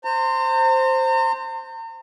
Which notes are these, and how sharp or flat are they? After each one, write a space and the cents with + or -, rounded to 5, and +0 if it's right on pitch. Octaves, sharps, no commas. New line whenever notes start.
C5 +0 A#5 -40